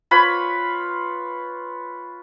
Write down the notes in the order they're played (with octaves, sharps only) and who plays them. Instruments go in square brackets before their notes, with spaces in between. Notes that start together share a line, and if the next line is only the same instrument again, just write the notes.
[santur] F4 B4 C#5 B5